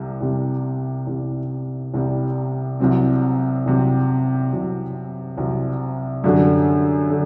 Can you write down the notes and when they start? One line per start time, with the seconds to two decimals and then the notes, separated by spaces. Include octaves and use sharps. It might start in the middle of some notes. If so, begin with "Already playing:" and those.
Already playing: C2 C3 G3
0.21 C2 C3 G3
1.07 C2 C3 G3
1.94 C2 C3 G3
2.80 C2 C3 F#3 C4
3.66 C2 C3 F#3 C4
4.52 C2 C3 F#3 C4
5.37 C2 C3 F#3 C4
6.24 F#2 D3 G3 D4 F#4
7.10 D3